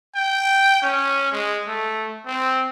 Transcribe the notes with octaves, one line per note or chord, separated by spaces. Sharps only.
G5
C#4
G#3
A3
C4